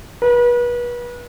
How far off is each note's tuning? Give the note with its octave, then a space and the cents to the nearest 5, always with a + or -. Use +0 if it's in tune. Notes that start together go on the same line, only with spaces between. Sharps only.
B4 -35